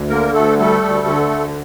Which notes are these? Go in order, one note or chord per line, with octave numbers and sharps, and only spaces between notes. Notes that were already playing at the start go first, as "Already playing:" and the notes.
Already playing: D2
D3 A#3 A#4
D2 A3 A4
G3 A3 A4
D2
D3
D2